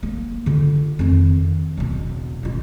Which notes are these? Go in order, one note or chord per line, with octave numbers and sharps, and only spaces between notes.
A#3
D3 F4
F2 D#3
E1 B2
A1 F4